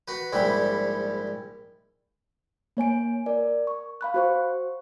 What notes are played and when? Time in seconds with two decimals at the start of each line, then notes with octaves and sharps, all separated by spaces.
0.08 F#4 B4
0.32 A#1 G#2 G3 E4 B5
2.77 A#3 C#5 G#5 D7
3.26 A#4 D5
3.67 C#6
4.01 F5 B5 F#6
4.14 F#4 C5 C#6